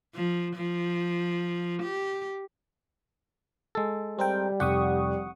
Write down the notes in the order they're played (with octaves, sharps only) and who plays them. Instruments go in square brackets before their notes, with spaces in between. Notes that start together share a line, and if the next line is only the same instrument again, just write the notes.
[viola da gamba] F3
F3
G4
[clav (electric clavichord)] G#3 A4
[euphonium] G3 [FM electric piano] C4 A#4 G5
[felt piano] F1 [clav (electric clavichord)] G4 [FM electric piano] F#5 C#6 D#6